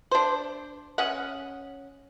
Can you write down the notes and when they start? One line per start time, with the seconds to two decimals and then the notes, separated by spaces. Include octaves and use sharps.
0.11 D4 C5
0.98 C#4 D#5 F#5